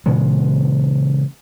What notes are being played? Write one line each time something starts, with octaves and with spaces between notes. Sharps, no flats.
A#2 C#3 E3 G#3